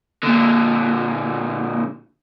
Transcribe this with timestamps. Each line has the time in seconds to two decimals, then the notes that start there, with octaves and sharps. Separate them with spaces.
0.23 A#2 D3